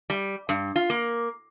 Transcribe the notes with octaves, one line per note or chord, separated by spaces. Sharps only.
G3
G2
F4
A#3